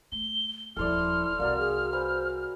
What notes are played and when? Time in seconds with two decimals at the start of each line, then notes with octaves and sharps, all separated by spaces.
0.12 A3 G7
0.77 D#1 F3 E4 A4 C5 D5 F6
1.39 C2 A#3 F#4 D5
1.58 G#4
1.93 B4 C5 G#5